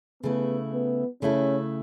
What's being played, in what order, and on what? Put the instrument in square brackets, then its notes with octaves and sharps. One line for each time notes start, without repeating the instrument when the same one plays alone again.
[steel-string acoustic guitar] C#3 A3 E4 [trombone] B3
[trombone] B3
[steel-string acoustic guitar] C#3 A3 E4 A4 [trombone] C#4